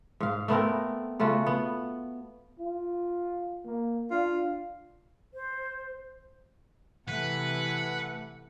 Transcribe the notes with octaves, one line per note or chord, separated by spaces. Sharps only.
G#2 F5
A3 B3 C4 A#4
C#3 A3 F4 F#4
B3
F4
A#3
D4 F4
C5
C3 E3 A3 B4 F#5